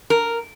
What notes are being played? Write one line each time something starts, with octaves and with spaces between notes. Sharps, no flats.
A#4